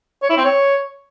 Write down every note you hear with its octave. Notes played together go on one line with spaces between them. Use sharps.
C#5
E4
C4
C#5